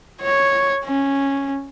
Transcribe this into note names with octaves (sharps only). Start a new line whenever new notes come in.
C#5
C#4